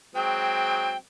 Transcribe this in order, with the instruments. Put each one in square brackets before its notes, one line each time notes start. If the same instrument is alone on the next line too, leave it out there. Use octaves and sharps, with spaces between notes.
[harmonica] F#3 G#3 C4 [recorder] G5